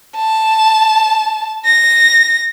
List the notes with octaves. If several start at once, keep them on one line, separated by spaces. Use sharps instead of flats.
A5
A#6